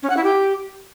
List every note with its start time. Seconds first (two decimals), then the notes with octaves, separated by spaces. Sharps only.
0.03 C#4
0.10 F#5
0.17 E4
0.24 G4